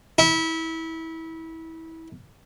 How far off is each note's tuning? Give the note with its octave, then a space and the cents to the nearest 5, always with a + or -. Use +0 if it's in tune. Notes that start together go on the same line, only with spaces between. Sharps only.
E4 -25